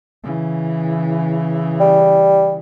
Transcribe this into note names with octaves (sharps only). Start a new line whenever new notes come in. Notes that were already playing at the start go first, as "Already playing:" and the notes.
C#3 E3
G3